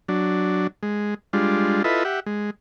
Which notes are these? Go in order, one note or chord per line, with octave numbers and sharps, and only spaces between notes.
F#3 D4
G#3
G3 G#3 D4 F4
E4 F4 A4 B4 D#5 E5
G4 E5 F#5
G#3